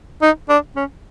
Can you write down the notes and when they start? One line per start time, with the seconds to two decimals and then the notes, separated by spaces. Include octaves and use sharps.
0.22 D#4
0.49 D4
0.76 C#4